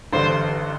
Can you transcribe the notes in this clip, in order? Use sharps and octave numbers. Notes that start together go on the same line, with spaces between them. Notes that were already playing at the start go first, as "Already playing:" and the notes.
A1 G2 D3 G3 C5